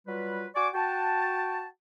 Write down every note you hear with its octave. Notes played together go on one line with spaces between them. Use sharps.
F#3 G3 F4 B4
F#4 D5 G#5 C#6 D6
F#4 G5 A5